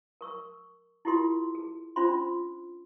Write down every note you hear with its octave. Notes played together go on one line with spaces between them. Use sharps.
A#4 C#6 E6
E4 F4 G4 A#4 C6
G#4
C#4 D4 F4 C5 B5 C6